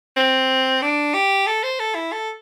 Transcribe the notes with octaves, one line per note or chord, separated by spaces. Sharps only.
C4
D4
G4
A4
C5
A4
E4
A4